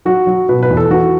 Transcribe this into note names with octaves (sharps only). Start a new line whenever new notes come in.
F#3 F#4
F#3
B2 B4
B4
E2
A4
E3 F#4